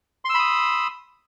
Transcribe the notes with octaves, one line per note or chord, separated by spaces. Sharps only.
B5 C6 D#6 E6